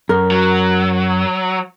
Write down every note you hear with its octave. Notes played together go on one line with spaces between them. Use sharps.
F#2 A#4
F#3